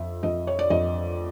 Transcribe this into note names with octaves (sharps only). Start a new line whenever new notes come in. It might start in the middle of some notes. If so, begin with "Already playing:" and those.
Already playing: F2 E5
F2 D#5
C#5
D5
F2 D#5